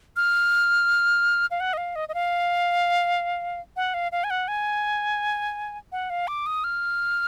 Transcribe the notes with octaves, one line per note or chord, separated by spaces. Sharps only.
F6
F5
F#5
D#5
F5
D#5
D#5
F5
F#5
F5
F5
G#5
F#5
G#5
F#5
F5
D6
D#6
F6